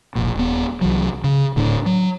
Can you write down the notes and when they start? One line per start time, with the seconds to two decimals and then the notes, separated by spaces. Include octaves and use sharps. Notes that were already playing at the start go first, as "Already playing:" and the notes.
0.15 E1 A#1 A#2
0.35 D#1 B3
0.81 C2 E3 F#3
1.24 C#3
1.56 D1 D2 A2 D4
1.86 F#3